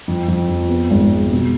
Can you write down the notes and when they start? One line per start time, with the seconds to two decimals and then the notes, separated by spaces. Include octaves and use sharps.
0.08 F2
0.28 F2
0.48 F3
0.69 B3
0.90 G#1
1.11 G#3
1.31 B2